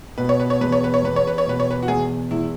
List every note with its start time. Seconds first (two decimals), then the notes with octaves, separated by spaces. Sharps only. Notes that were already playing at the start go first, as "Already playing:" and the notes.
0.18 B2 B4
0.29 C#5
0.40 B4
0.50 C#5
0.60 E2 B4
0.72 C#5
0.84 B4
0.94 C#5
1.03 E2 B4
1.16 C#5
1.27 B4
1.38 C#5
1.46 B2 B4
1.60 C#5
1.71 B4
1.83 F#4
1.88 E2 G#4
2.31 E2 E4